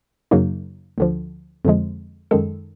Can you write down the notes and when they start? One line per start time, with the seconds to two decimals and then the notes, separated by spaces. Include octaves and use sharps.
0.31 F#2 C#3 F#3 A#3 D#4
0.98 D2 D3 F3
1.65 F2 D3 F3 G#3
2.31 F#2 D#3 G#3 A4